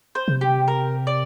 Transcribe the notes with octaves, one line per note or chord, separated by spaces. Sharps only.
C5
C3
G4
A#4
D5